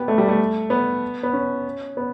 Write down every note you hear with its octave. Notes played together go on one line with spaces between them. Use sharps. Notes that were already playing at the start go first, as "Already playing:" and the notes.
Already playing: B3 G4
A3
G3
A3
B3
B3
C#4
B3